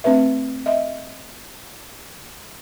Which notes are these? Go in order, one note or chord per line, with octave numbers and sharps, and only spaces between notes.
A3 C4 D4 B4 E5
D#5 E5